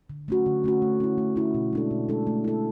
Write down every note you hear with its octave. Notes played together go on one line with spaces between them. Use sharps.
D3
A3 C#4 F#4
D3
A3 C#4 F#4
A3
C#4 E4
A3
C#4 E4
B2
G#3 D4 A4
B2
G#3 D4 A4
A3
E4 A4